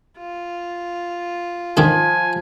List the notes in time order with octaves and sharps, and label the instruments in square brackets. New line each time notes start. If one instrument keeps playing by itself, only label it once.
[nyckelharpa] F4
[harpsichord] D#3 D4 A4 [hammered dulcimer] F3 [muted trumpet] G#5